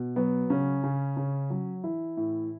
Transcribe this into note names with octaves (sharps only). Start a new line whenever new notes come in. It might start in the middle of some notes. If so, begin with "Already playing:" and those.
Already playing: B2
F#3 B3
C#3 C#4
C#3
C#3
F#3
E3 E4
A2